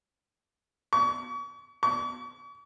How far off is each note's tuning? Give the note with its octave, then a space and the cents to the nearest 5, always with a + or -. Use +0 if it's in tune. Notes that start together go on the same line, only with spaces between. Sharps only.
C#6 +40
C#6 +45